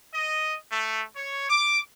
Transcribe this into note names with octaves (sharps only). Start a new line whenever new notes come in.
D#5
A3
C#5
D6